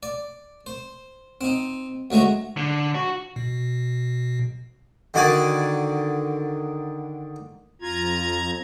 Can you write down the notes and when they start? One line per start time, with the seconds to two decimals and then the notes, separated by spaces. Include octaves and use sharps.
0.03 D5
0.66 C5
1.41 C4 D#4
2.11 D2 F#3 G#3 A3 A#5
2.57 D3
2.95 F#4
3.36 B2
5.14 D3 D#3 F#4 D5 G#5
7.82 F2 F4 A#5 G#6